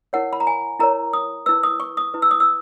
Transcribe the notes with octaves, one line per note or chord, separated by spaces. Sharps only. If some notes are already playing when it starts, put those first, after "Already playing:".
E4 A#4 C#5 F#5
B5
A#5
G#5
E4 A#4 C#5 A#5
D#6
E4 B4 E6
D#6
C#6
D#6
E4 B4
E6
D#6
E6